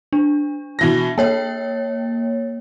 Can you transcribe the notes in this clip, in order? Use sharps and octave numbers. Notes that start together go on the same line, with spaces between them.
D4
B2 E3 A#6
A#3 A4 C#5 G5